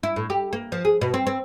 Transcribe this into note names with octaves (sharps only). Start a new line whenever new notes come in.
E4
A2
G4
A#3
F3
G#4
B2
C4
C4